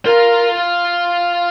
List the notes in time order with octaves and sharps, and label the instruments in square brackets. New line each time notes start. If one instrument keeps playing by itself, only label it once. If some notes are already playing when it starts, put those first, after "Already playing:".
[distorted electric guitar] F4 [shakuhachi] A#4